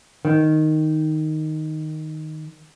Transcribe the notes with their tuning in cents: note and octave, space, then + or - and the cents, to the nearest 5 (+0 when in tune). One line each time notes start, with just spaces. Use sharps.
D#3 +0